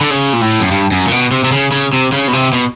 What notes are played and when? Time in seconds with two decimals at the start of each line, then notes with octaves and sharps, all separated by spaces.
0.01 D3
0.10 C#3
0.33 A#2
0.41 A2
0.60 F#2
0.71 G2
0.91 F#2
1.06 A#2
1.12 B2
1.32 C3
1.44 C3
1.52 C#3
1.72 C#3
1.93 C3
2.12 C#3
2.28 B2
2.33 C3
2.53 B2